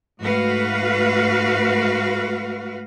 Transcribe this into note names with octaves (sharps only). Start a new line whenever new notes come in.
G#2 A3 F#4 B4 F5